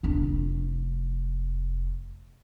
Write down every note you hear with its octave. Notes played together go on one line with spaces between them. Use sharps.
F1 D4